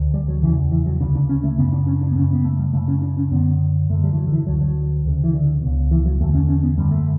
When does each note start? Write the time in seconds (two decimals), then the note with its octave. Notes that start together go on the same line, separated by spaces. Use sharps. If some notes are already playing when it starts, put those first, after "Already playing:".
Already playing: D2 D3
0.14 G3
0.28 F#3
0.43 E2 C#3 E3
0.72 E3
0.86 F#3
1.00 C#3 D4
1.04 D2
1.15 D4
1.29 C#4
1.44 A3
1.58 F#2 C#3 B3
1.73 D4
1.87 C#4
2.02 D4
2.12 B3
2.16 F#2 C#4
2.20 C#3
2.33 B3
2.45 A3
2.59 G3
2.73 F#2 C#3 A3
2.88 C#4
3.02 D4
3.17 C#4
3.31 F#2 D3 B3
3.89 F#2 A3
3.93 D3
4.04 G3
4.13 E3
4.17 F#3
4.27 D3
4.32 E3
4.47 D2 D3 F#3
4.61 F#3
5.05 D2 C#3
5.24 E3
5.33 D3
5.62 C#2 B2
5.91 E3
6.06 F#3
6.20 E2 D3 A3
6.35 C#4
6.49 C#4
6.63 B3
6.77 F#2 D3 G3
6.91 A3